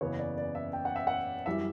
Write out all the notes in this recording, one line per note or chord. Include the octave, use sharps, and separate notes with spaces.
F#1 E2 C#3 E3 B3 C#5
D5
D5
E5
G5
F#5
E5
F#5
F#2 E3 G3 E5